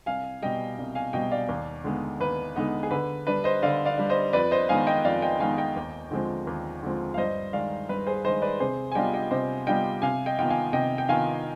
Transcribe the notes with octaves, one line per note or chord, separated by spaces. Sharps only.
C2 F5 G#5
B2 G3 D#5 G5
C2
F5 G#5
B2 G3 D#5 G5
D5 F5
D#2
D3 G#3 B3 D#4
D#2 B4
D3 G#3 B3 D#4
G#4
D3 B4
G3 D4 B4
C5 D#5
D3 D5 F5
D5 F5
G3 D4
C5 D#5
F2 B4 D5
C5 D#5
D#3 G#3 B3 D#4 F5 G#5
D#5 G5
F2 D5 F5
D#5 G5
D#3 G#3 B3 D#4 F5 G#5
D#5 G5
D#2
D3 F3 G#3 C4
D#2
D3 F3 G#3 C4
F5
G2 C5 D#5
D#3 G#3 D5 F5
G2 B4
G#4 C5
D#3 G#3 C5 D#5
B4 D5
C3 G#4 C5
G#5
G3 B3 D4 F4 D#5 G5
D#5 G5
C3 C5 D#5
G3 B3 D4 F4 D#5 G5
C3 F5 G#5
D#5 G5
D#3 B3 F4 G5
F5 G#5
C3 D#5 G5
G5
D#3 B3 F4 F5 G#5